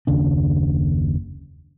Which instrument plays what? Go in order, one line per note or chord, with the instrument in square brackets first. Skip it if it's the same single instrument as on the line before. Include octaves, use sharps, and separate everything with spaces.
[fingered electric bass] F#1 D#2 C#3 D4